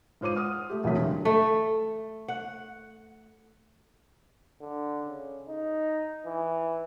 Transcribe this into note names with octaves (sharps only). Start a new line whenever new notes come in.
G#2 F4 C5 D6 D#7
F#5 C6 D#6 F6
A3 G4
E1 D2 C3 E3 F#3 B6
D3
A3
F#5
D3
C#3
D#4
E3